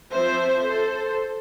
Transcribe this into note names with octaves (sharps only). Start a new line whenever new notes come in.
F3 C4 C5 E5
A4 C5